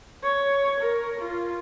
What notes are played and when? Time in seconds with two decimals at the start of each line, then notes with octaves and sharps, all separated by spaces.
0.24 C#5
0.79 A#4
1.20 F4